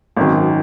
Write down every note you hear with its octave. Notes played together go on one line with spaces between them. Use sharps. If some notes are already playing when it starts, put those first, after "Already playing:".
G#1 F#2 D#3